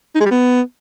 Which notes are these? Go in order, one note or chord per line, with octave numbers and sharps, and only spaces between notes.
D#4
G#3
G3
B3